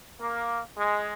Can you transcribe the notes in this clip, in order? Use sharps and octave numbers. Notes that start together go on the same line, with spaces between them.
A#3
G#3